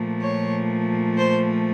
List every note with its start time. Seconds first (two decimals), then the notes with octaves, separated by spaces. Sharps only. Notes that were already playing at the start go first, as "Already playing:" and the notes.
Already playing: A#2 F3 A3
0.22 C#5
1.18 C5